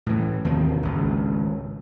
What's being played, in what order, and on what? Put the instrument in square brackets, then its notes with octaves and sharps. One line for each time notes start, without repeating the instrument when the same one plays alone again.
[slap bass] A2 E3
D#2 C3 D#3 A#3
G#1 C#2